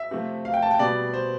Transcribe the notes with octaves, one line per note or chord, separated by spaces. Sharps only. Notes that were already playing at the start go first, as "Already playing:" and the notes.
Already playing: E5
C3 F3 A3
F5
G5
A5
G5
B2 G3 D5
C5